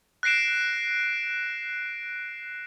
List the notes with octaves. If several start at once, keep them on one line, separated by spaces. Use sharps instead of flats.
F#6 A#6 C7 D7 E7